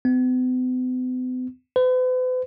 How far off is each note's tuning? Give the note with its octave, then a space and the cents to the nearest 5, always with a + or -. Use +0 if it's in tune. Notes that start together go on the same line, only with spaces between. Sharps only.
B3 +45
B4 +45